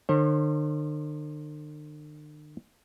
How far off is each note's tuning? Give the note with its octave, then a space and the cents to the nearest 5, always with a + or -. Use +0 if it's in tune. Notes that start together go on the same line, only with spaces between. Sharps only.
D3 +45 C5 +40